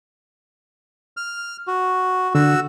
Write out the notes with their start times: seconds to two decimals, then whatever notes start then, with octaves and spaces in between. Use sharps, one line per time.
1.17 F6
1.67 F#4
2.35 D3 F#4 E6